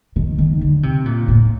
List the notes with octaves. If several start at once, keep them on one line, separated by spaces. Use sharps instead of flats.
D#3
D#3
D3
C3
A#2
A2